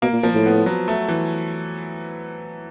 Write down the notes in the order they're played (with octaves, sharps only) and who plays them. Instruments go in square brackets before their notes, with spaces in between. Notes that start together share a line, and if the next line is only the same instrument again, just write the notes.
[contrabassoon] B2 [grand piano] A#3
[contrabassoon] A#2
[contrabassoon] A#2 [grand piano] F3
[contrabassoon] A2
[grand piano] B3
F#3
A3
E3